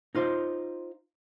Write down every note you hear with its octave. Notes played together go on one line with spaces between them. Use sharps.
D#4 F4 C5